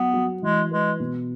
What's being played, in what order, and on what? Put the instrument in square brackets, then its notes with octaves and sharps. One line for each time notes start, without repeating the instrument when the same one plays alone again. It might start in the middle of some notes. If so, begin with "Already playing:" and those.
Already playing: [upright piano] F#3 [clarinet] B3
[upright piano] F#3
[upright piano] E3 [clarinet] G#3
[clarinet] G#3 [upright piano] B4
[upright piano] B2